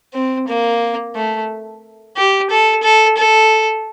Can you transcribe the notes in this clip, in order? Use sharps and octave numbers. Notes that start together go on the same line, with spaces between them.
C4
A#3
A3
G4
A4
A4
A4